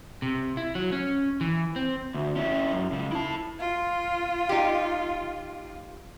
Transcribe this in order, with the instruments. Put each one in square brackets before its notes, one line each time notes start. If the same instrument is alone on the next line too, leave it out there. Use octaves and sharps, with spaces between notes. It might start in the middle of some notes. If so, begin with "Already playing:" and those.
[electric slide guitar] C3
E4
F#3
C#4
E3
C4
[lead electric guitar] D2
C#4 E4
F#2
C#2 C#3
E4 A5
[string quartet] F4
[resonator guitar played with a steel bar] D#4 G4